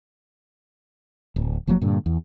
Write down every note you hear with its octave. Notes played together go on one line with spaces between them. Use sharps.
D1
F1 F3 F#3 A#3
G2 A#2 D3
E2